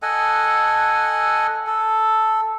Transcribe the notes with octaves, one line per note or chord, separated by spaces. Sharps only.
A4 D#5 F#5 G#5
A4